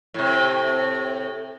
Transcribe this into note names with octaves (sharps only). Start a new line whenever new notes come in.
A2 C3